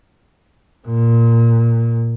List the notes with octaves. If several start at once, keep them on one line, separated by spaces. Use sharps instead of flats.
A#2